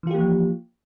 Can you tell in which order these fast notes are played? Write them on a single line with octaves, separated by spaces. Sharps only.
E3 F4 G4 A#3 F3